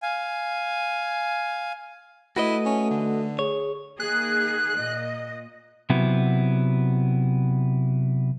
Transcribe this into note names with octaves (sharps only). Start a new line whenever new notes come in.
F5 G#5
A3 E4 F#4 B4 D#5
C#4
D3
G#4 C#5
D#3 A#3 G#4 F#6
A#2 D#5
C3 F#3 B3 E4